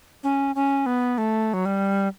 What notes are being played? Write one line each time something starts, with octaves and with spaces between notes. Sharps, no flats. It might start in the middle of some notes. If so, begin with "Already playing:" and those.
C#4
C#4
B3
A3
F#3
G3